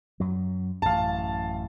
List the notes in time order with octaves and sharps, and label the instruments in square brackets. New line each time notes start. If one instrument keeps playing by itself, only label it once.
[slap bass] F#2 F#3
[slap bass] A1 F#2 [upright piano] F5 A5